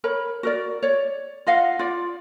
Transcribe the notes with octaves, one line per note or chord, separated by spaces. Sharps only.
A#4 C#5 B5
F#4 A#4 D5
C#5 D5
F4 D#5 F5 F#5
F4 D5